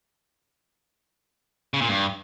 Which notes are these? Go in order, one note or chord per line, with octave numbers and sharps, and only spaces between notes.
C#3
A#2
G2